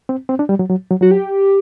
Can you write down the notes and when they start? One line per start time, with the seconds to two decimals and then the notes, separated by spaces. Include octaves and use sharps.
0.09 C4
0.29 C4
0.39 D4
0.49 G3
0.59 F#3
0.70 F#3
0.90 F#3
1.01 F#3 F#4
1.11 G4